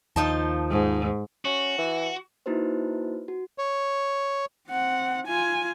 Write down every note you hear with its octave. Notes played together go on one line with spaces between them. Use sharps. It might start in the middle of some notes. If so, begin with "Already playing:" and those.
D#2 F3 D#4 A5
G#2
C#4 F#4
E3
A#3 D#4 E4 F#4 B4 C5
F#4
C#5
C4 F#5
F4 G#5